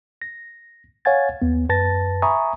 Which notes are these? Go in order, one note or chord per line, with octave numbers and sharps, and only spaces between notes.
A#6
C#5 F5 F#5 G#5 G#6 A6
D#2 B3
F#2 B4 A5 A6 A#6
E5 G#5 A#5 B5 C#6 D#6